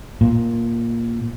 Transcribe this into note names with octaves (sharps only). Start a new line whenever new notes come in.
A#2